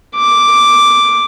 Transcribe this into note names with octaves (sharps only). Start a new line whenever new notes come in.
D6